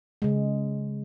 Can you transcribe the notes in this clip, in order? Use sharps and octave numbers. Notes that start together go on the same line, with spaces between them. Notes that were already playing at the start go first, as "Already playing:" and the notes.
C#3 G#3